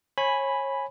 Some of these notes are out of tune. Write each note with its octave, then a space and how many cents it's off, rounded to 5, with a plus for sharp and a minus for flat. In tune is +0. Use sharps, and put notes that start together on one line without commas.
C#5 -30 G#5 +0 B5 +0